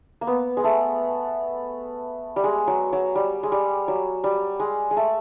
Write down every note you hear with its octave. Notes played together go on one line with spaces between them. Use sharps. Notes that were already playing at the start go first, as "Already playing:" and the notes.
A#3
B3
G#3
A3
G3
G#3
F#3
F#3
G3
G#3
G3
F#3
G3
G#3
G#3
A3